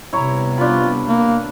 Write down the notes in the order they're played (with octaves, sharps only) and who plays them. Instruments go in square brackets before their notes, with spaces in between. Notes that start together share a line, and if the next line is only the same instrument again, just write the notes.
[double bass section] C3 G3 B3 [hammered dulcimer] E4 C#5 A#5
[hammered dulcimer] D4 B5 [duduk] F4
[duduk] A#3